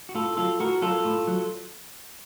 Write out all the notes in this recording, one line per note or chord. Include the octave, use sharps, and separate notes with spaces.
F#4
A2 F4 A4
F#3 F4 A4
A2 F#4 A#4
F#3 F4 A4
A2
F#3